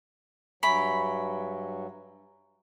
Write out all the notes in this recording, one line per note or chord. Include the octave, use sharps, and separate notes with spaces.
G2 F#3 E5 G#5 B5 C#6